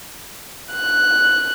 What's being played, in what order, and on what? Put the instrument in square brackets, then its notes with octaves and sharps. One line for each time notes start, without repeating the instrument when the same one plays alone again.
[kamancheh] F#6